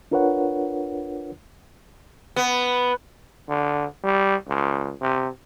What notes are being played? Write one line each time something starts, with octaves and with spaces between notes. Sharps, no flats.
D4 F4 A#4 B4 C#5 F#5
B3
D3
G3
C#2
C3